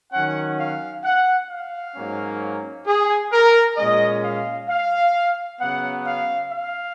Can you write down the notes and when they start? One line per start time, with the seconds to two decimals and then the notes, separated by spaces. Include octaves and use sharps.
0.12 D#3 F#3 C#4 F#5
0.58 F5
1.04 F#5
1.49 F5
1.95 G#2 F#3 A#3 C#4
2.86 G#4
3.31 A#4
3.77 A#2 G#3 C#4 D#5
4.22 F5
4.68 F5
5.59 C#3 F#3 B3 F#5
6.04 F5
6.50 F5